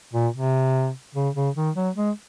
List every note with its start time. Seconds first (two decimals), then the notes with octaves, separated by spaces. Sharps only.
0.13 A#2
0.34 C3
1.15 C#3
1.35 C#3
1.56 D#3
1.75 F#3
1.96 G#3